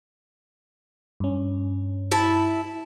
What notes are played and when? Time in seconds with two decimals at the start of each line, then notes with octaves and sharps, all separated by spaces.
1.20 G2 C#4
2.11 E4 A5